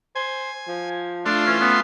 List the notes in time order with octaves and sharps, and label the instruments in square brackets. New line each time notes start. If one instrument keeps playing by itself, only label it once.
[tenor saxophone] C5 [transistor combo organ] G#5
[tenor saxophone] F3
[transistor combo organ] A3 F4 C6 [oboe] D4
[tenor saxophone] E3 [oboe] C#4
[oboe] B3 [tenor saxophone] C#4